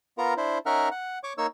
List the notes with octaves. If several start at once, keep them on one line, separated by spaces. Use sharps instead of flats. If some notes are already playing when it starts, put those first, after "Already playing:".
B3 F4 A#4 A#5
D4 E4 C5
C#4 D#4 A#4 E5 F#5 F6
F#5
C#5 C#6 D6
A#3 D#4 C#5 E6